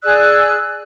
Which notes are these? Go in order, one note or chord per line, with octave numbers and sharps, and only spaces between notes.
G#4 D5 E6 F#6